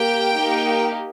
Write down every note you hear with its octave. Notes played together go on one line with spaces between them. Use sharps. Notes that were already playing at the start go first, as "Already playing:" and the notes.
Already playing: A#3 G4 G5
A#3 D#4 G4